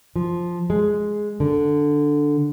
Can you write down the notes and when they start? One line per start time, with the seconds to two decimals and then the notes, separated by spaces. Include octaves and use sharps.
0.16 F3
0.70 G#3
1.40 D3